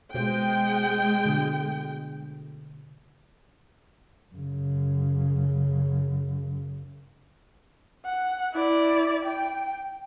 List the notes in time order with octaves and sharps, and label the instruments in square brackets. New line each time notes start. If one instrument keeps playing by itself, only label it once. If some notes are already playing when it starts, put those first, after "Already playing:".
[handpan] B2 C5 [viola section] G#3 G5
[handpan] B2 D3 A3
[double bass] F#2 C#3
[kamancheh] F#5
E4 D5
G5